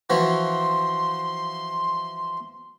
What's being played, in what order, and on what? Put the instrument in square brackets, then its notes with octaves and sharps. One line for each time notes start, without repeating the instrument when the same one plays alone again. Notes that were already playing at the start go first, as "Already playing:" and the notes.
[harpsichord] E3 F3 F#4 [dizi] C6